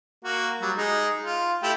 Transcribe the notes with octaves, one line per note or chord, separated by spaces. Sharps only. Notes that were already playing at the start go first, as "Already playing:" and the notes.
A#3 F#4
F#3 G3
G#3 D#4
F4
A3 E4 G4